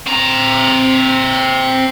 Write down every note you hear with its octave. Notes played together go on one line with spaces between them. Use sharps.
C4 A#5